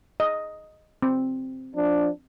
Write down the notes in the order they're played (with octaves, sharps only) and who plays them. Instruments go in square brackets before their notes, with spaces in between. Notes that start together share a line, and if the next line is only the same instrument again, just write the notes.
[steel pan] D#5
C4
[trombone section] F3 D4